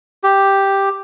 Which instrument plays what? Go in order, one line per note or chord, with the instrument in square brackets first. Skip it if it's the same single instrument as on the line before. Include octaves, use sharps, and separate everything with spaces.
[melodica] G4